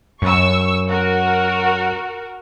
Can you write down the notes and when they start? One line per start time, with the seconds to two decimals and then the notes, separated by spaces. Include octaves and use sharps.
0.22 F#2 C#6 E6
0.88 F#4 A#4